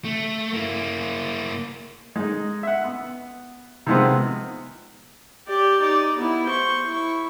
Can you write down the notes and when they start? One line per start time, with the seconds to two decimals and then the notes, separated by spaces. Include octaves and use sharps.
0.05 A3
0.53 A#3 E4
2.16 G#3 D#4
2.63 E5 F#5
2.84 B3
3.87 C3 D#3 F3 G#3 B3 C4
5.47 G4 D5
5.81 D#4 D5
6.17 B3 E4
6.46 C5 C#6
6.86 E4 C#6